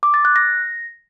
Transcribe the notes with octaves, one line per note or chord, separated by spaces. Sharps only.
D6
A6
F#6
A#6